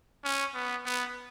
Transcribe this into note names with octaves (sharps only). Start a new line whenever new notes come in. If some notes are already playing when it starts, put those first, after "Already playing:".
C#4
B3
B3